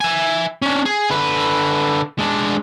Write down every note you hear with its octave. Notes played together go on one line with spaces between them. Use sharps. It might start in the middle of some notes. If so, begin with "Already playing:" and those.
E5 G#5
C#4 D4
G#4
D3 B4
G#3 D4